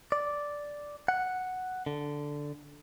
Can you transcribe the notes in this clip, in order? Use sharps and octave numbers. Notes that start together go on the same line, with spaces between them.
D5
F#5
D3